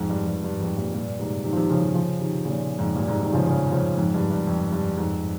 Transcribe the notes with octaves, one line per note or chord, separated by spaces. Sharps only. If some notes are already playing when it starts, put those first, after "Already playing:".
Already playing: F2 G#2
G2
G2
G2
F2 G#2
G2 A#2
G2 A#2
G#2 C3
C3 D#3
F3
C3 D#3
C#3 F3
C3 D#3
C#3 F3
C3 D#3
A#2 C#3
F2 G#2
G2 A#2
G#2 C3
C3 D#3
C#3 F3
C#3 F3
C#3 F3
F2 G#2
G2
G2
F2
G2
F2 G#2